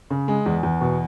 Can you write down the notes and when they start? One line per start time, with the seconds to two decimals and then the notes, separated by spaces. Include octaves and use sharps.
0.10 C#3
0.28 G#3
0.46 E2
0.63 E2
0.81 B2